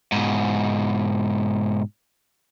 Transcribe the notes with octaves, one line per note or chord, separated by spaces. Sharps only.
G#2 B2